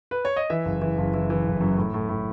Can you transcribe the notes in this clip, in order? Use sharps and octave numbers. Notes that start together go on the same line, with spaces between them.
B4
C#5
D#5
E3 E5
F#1
E3
F#1
E3
E3
F#1
F#2
A2
A2
A2